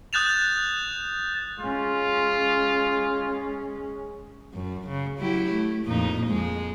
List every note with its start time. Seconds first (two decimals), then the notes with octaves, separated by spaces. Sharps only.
0.13 D#6 F#6 G6 A6 E7 F7
1.59 G#3 C#4 F4
4.54 F#2
4.88 C#3
5.19 F#3 E4 G4
5.52 A3
5.86 F2 A#2 D#4
6.27 F2 G#3